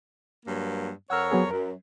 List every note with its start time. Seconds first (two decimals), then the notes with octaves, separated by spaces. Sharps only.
0.46 G2 F#3 A#3
1.10 F2 A#4 C#5 F#5 E6 F6
1.31 F#3 B3 G#4
1.51 F#2 A#4